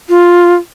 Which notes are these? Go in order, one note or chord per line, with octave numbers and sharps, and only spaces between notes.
F4